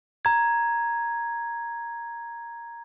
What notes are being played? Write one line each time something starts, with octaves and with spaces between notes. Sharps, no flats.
A#5 G#6